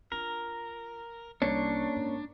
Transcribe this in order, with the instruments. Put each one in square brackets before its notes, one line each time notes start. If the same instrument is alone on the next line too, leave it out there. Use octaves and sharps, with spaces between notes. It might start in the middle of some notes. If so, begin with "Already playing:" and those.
[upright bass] D4 F4 [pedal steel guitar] A#4
[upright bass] C2 [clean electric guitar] A#3 C#4 C#5 [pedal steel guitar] D4
[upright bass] G#2